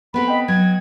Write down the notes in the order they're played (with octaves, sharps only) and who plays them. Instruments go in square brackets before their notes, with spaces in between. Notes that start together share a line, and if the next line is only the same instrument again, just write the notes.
[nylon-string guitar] B3 C4 A4 [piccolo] B5
[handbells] D#5 G5
[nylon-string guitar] F#3 [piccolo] G#6